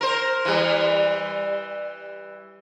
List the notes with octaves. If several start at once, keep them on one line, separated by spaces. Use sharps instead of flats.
A#4 C5
E3 G3